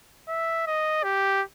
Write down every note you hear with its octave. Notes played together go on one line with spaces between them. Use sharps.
E5
D#5
G4